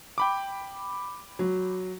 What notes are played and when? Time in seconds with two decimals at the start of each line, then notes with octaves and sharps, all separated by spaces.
0.18 G5 B5 D6
1.39 F#3